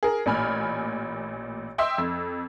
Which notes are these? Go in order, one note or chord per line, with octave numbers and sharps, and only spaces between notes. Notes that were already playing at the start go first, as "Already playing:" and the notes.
G#4 A#4
A1 A#2 G#5 B5 F6
D#5 E5 G5 C6 E6
F2